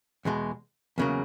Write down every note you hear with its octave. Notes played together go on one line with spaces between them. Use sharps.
E2 B2 G#3
E2 C#3 F#3 A#3